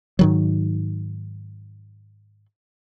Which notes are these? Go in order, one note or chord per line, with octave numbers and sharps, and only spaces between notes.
G#2 D#3 F#3